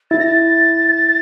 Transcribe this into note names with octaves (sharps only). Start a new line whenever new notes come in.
E4 A6
A#6
A6